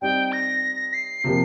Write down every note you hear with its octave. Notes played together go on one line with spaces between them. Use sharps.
G3 C4 D#4 G4 G5
A#6
C7
C3 F3 A#3 G4